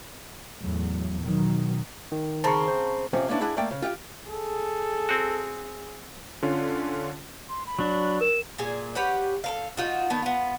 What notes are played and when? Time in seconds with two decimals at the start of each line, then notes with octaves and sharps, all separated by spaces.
0.61 E2 A2 F#3
1.21 B2 D#3 F#3
2.12 D#3
2.44 C#3 C4 A5 A#5 C#6
2.68 C5
3.13 F2 C3 F3 C4 C#4
3.28 A#3 B3 C#4 D4 E4
3.41 D4 E4 G#4 F#5
3.57 A3 A#3 D5 G5
3.71 C#3
3.82 F4 G4 E5 G5
4.30 G#4 A4
5.09 C4 F#4
6.42 D3 C#4 F4
7.49 C6
7.66 B5
7.79 F#3 D4
8.21 A#4 E7
8.58 A#2 G#4 G#5
8.95 G4 B4 C#5 F#5
9.44 A4 A#4 F5
9.77 D#4 F4 F#4
10.10 D#3 B3 A5
10.22 B3 F4